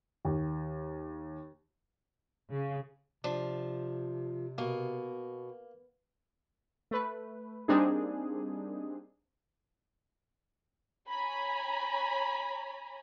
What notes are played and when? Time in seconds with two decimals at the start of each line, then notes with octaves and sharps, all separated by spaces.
0.25 D#2
2.51 C#3
3.24 C3 F3 D4
4.58 B2 A#3
6.91 A3 B4
7.68 G3 A#3 C4 D4 D#4 G#4
11.08 C#5 G#5 A#5 B5